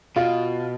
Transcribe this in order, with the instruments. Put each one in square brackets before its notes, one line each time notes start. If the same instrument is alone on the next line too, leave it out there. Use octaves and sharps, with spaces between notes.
[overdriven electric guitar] B2 [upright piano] F4